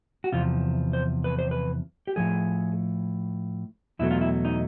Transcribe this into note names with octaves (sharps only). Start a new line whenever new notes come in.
F#4
E2 C3 F3 F4
C5
B4
C5
B4
G4
A2 F3 A3 G#4
E2 B2 F#3 A3 E4
F4
E4
D#4